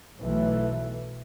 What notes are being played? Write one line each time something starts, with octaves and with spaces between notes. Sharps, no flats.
B1 E3 A3